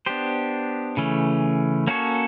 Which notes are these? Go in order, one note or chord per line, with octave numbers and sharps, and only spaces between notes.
B3 D4 G4 C5
C#3 E3 A3 C#4
A#3 C#4 F#4 A4 C#5